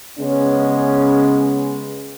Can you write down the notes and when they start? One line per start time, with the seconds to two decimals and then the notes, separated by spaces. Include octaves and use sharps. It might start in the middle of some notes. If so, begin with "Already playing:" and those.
0.20 C#3 G#3 B3 C#4